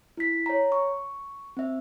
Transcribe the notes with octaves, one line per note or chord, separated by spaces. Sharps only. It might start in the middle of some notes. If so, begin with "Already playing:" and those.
E4 B6
C#5 A#5
C#6
C4 E5